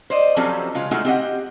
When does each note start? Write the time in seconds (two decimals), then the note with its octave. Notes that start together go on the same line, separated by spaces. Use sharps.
0.10 C5 D5 D#5
0.36 F3 F#3 C4 C#4 G4 A4
0.75 C#3 G#3 F4
0.91 G#3 A3 C#4 D#4 F4 F#4
1.05 C4 G4 D#5 F#5